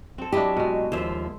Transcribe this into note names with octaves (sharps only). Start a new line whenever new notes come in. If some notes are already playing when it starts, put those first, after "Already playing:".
C4 A4
F#3 D4 E4 G4 D#5
B2 G#3
D#2 F3 C5 E5